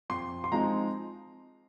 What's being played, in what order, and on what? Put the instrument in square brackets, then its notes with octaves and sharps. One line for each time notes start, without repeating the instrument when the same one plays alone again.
[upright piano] F2 C6
C6
F3 G#3 C4 D#4 A#5